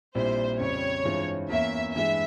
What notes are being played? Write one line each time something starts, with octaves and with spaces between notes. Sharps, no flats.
A#1 A#2 G3 C4 E4 C5
F2 C#3 G3 C#5
G2 E3 G#3 C4 F4
E2 E3 A#3 C#4 E5
G2 E3 G#3 E5